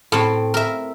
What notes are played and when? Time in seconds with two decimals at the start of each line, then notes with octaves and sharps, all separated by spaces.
0.12 A2 C4
0.54 A#4 E5